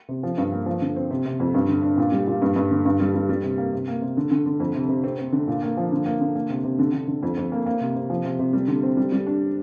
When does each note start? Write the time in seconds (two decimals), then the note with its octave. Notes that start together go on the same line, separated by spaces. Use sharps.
0.08 C3
0.23 F3
0.38 G2
0.52 A#3
0.66 F3
0.81 D3
0.96 C4
1.10 C3
1.26 C3
1.40 F2
1.54 G2
1.68 D3
1.83 D4
1.98 A#2
2.12 G3
2.27 A#2
2.42 G2
2.56 G2
2.71 D3
2.85 G2
3.00 G3
3.14 G3
3.29 G3
3.43 C3
3.58 A#3
3.72 C3
3.88 A#3
4.01 C3
4.17 D3
4.31 D3
4.46 D3
4.60 F2
4.75 C3
4.89 C3
5.04 C4
5.18 C4
5.32 D3
5.47 A#2
5.63 A#3
5.77 F3
5.92 D3
6.06 A#3
6.20 D3
6.35 A#3
6.50 C3
6.64 C3
6.79 D3
6.94 D3
7.08 D3
7.23 F2
7.37 F2
7.52 A#3
7.66 A#3
7.81 C3
7.95 C3
8.10 F3
8.25 C3
8.39 C3
8.53 G3
8.68 D3
8.83 C4
8.97 G3
9.12 G3
9.27 D4